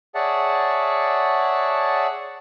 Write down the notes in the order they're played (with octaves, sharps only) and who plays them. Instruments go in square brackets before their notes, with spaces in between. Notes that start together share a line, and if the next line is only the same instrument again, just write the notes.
[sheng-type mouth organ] G#4 C#5 D5 E5 F#5 A5